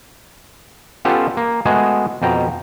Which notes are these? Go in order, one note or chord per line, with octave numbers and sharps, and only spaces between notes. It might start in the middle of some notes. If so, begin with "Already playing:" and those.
B3 C#4 F4 G4 A4
A#3
G#3 A3 B3 F#4 G#4
F2 B2 G5 A#5